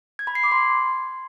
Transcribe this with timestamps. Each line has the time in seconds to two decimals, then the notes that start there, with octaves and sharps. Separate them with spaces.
0.19 G#6
0.27 B5
0.35 C7
0.44 D6
0.52 C6